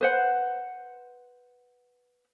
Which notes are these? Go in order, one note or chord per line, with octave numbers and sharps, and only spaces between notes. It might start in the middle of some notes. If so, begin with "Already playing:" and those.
B4 C5 F#5